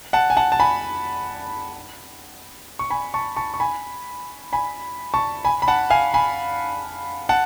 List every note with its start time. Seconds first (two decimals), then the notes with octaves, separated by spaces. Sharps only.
0.13 F#5 A5
0.30 G#5
0.37 F#5 A5
0.52 A5
0.60 G#5 B5
2.79 C#6
2.90 G#5 B5
3.14 A5 C#6
3.36 A5 C#6
3.54 C#6
3.60 G#5 B5
4.52 G#5 B5
5.14 A5 C#6
5.45 G#5 B5
5.62 B5
5.68 F#5 A5
5.90 F5 G#5
6.14 G#5 B5
7.29 F#5 A5